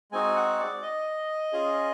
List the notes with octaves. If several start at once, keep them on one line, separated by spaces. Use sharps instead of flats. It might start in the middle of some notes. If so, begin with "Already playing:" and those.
G#3 C4 D#4 F#4 G#5
F#5
D5
D#5
C#4 F4 G#4